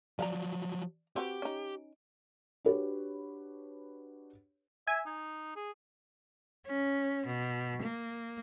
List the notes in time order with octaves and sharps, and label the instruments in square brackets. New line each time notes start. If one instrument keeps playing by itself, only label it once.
[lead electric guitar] F3 F#3 [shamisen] D5 F#5 A#5
[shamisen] C4 F#4 B4 [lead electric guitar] G4
[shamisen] C#4 D#4
[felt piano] D4 F#4 G4 B4 C#5
[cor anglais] E5 [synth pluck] G#5
[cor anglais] D#4
G#4
[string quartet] C#4
B2
A#3